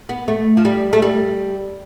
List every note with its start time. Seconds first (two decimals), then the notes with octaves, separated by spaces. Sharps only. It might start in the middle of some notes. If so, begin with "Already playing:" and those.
0.09 B3
0.28 A3
0.57 F3
0.65 G3
0.93 A3
1.02 G3